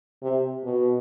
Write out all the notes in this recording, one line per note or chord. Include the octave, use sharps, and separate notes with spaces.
C3
B2